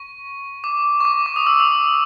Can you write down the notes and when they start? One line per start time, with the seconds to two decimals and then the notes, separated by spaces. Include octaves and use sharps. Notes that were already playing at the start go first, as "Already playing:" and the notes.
Already playing: C#6
0.64 D6
1.00 C#6
1.05 D6
1.26 D6
1.36 D#6
1.47 E6
1.60 D#6